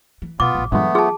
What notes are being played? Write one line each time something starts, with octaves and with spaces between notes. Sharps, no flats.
E3
B2 B3 F4 D6
A1 A#2
G2 A#2 E3 F#3 G#3 A3 B3
F4 G#4 A5